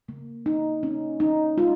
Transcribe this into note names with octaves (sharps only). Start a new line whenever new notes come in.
C#3 A#3
D#4
C#4
D#4
G#3 F4